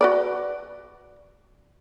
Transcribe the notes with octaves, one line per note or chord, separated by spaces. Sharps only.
F#4 B4 D5